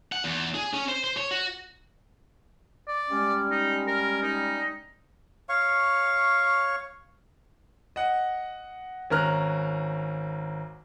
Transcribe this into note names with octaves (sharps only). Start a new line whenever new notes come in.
F#5
E2
G#4
C#4
C5
C5
C#5
F#4
D5
G3 G#3 C#4
D#4
A#4
D#4
C#5 F5 C#6
D#5 F#5
G#1 C#4 A#4 A#5 F6 F#6